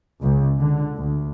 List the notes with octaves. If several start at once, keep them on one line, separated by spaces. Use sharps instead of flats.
C#2
D3
D2